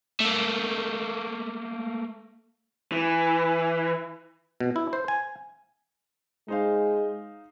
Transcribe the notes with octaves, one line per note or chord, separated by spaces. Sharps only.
A3 A#3
E3
B2
E4
C5
G#5
G#3 D#4 C5 F5